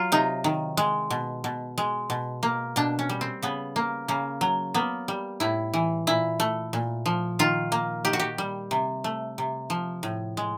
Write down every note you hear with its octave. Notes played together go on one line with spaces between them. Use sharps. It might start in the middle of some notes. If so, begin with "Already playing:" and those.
Already playing: F#3 F4
C3 D#4
D#3
G#3
B2
B2
G#3
B2
A#3
B2 D4
C#4
G3
C4
C#3 B3
A#3
C#3 A#3
F#3
A#3 B3
G3
A2 E4
E3
A#2 E4
A3
A#2
F3
D#3 F4
A#3
D#3 G4
F#4
G4
G3
C3
A3
C3
F3
A2
G#3